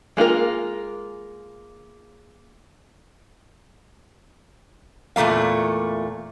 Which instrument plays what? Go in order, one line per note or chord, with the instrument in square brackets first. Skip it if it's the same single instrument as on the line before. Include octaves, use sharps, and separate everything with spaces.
[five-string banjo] G#3 A#3 F4 A#4
[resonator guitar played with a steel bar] E2 A#2 A3 A#3 F5